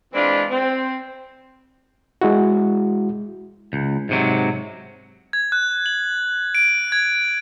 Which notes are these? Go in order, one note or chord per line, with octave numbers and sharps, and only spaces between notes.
E3 G#3 C4 D4 E4 F4
C4
G#3 E4 F#4
C#2
G#2 C3 F#3
G#6
F#6
F#7
D7
G#6